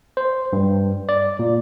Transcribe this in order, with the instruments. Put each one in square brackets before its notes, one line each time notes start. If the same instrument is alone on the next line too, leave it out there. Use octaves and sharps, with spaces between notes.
[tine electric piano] C5
G2
D5
A#2